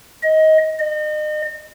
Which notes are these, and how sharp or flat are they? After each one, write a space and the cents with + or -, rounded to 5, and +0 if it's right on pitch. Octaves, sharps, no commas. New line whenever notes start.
D#5 +20
D#5 -35